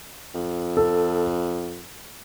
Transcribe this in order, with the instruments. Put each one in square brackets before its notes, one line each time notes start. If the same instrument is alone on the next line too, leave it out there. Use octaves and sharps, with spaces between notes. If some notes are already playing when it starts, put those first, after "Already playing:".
[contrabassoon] F2
[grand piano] A4